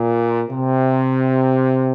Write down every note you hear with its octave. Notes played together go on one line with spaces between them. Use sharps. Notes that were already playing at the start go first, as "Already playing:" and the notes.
Already playing: A#2
C3